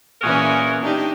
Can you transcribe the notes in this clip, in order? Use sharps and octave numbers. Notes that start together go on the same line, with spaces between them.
A#2 E3 C#4 F#4 G#4 A#4
D4 D#4 G4